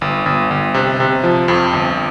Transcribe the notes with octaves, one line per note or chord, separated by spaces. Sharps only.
G1
G1
G1
C3
C3
F3
F2
G1